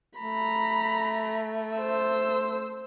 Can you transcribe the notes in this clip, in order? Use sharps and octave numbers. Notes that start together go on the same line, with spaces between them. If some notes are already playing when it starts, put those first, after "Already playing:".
A3 A#5 B5
C5 E6